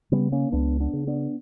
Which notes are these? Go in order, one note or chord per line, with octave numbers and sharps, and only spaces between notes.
C#3 G3 B3
A#3 C#4
C#2 B3 D4
B3 D4
C#3
B3 D4